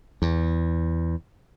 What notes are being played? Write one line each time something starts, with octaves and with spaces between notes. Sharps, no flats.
E2